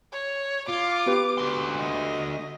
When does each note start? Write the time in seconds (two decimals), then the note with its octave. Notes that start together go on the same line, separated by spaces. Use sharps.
0.13 C#5
0.69 F4 D6
1.06 B3 G4 B4
1.38 D2 C6
1.79 D#5